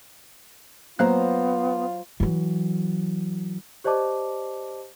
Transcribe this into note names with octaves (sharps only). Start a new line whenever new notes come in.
F#3 A#3 B3 F4 C5 F5 A#5 F#6
E3 F#3
G4 C5 D5 D#5 A5 D6